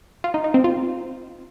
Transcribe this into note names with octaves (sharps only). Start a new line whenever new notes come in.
F4
D#4
D#4
C4
F4